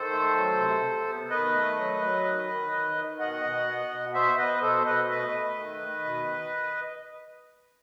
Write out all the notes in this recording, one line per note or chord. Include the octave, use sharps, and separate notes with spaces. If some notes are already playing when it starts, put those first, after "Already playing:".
Already playing: D#3 A4 C5
A3
F#3
C3
C3
B3
D#3 B4 D#5
A3
F#3
F#3
D#3
D#3
D#3
D#3
B2 D#5 F#5
B2
B3
B2
B3 C5 E5
B3 B4 D#5
B2 A4 C5
B2 B4 D#5
A3 B4 D#5
A3
D#3
D#3
B2